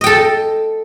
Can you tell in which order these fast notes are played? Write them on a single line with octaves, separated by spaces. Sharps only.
D#5 G5 A4